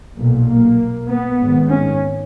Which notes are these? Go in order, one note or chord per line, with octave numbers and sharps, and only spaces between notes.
B1 A#2
A#3
B3
G#1 G#2
C#4